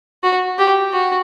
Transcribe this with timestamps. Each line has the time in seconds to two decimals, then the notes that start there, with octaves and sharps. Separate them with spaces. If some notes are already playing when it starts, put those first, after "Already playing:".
0.24 F#4
0.59 G4
0.93 F#4